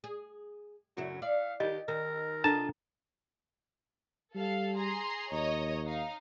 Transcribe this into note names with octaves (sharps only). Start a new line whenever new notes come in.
G#4
F#2 C#3 F#3 E4
D5 F5
D#3 G4 D#5
D#3 A#4
C3 D4 F4 A4 D#5 A5 A#5
G3 A4 F5
G#4 A#5 C6
D#2 C#5 D#5 A#5
D#4 F5